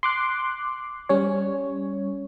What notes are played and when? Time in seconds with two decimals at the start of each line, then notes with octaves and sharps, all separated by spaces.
0.03 C6 D6 F#6
1.09 G3 C#4 C#5